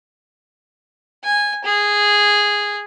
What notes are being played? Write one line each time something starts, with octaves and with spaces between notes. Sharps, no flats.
G#5
G#4